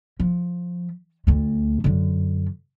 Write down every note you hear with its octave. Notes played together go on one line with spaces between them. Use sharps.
F3
D2 A3
F#2 D3